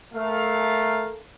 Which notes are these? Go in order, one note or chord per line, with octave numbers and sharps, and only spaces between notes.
A3 A#4 F5